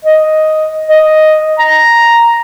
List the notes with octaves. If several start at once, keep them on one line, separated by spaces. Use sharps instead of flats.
D#5
D#5
A#5